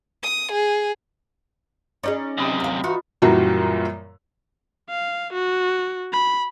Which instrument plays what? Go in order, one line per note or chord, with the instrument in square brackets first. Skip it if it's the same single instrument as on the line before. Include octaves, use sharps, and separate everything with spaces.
[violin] D#6
G#4
[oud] C#4 D#4 G#4 [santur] D5 A#5
[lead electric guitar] F#2 C3 [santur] G4 B4 D#5
[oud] D#2 F5
[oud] E3 D#4 F#4 [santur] F4
[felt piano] F#2 A#2 E3 F#3 G3 F#4
[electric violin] F5
F#4
B5